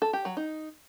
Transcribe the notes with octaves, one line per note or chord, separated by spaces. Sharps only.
A4
G4
F#3
D#4